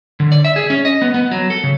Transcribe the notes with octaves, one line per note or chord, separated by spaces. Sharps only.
D3
D5
E5
G#4
C#4
D#5
B3
B3
F#3
A4
C#3